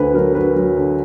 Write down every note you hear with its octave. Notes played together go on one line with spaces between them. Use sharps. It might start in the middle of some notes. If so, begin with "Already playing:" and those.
Already playing: D2 D3 B4 C5
F#3 A#4
F#3 B4
F#3
D3